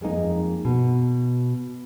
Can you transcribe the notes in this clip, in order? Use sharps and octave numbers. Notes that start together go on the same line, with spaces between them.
F2 G#3 A#3 D#4 A#4
B2